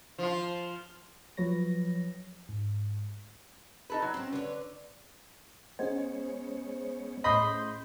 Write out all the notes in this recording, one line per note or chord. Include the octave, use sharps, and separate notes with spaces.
F3 F4
F3 F#3 B4 C#5 A#6
G#2
D#4 A4 B4
F#3
C4 C#4
D3 B4 C#5
G#3 B3 C#4 G#4 C5 C#5
A2 D#5 B5 C6 G6